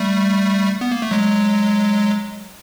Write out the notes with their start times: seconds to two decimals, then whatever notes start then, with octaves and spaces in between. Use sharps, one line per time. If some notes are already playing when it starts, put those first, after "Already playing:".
Already playing: G3 A3
0.81 B3
0.91 A#3
1.02 A3
1.11 F#3 G#3